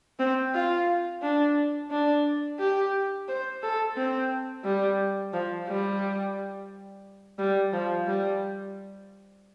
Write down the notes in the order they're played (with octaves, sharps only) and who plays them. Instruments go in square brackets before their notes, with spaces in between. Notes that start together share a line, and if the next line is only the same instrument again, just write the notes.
[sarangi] C4
F4
D4
D4
G4
C5
A4
C4
G3
F3
G3
G3
F3
G3